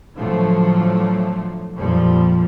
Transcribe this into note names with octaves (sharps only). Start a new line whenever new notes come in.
A2 D3 F3 F#3 A3
F2 A#2 F3 G3